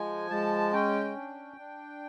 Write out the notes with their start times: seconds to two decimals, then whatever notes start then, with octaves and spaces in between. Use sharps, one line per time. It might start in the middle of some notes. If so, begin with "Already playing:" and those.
Already playing: F3 G#3 G#5
0.30 G#3 A5
0.73 C#4 G5
1.16 D4
1.57 D4